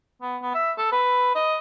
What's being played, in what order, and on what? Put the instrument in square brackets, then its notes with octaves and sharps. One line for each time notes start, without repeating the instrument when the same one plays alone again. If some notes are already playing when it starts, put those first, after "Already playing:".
[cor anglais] B3
B3
E5
A4
B4
D#5